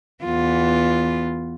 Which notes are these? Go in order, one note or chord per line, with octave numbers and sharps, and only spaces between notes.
E2 B3 F4